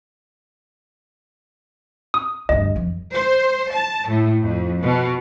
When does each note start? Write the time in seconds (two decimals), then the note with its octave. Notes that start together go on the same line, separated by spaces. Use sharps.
2.14 D#6
2.49 D2 G2 D#5
2.76 F2
3.13 C5
3.72 A5
4.08 A2
4.42 F2
4.81 B2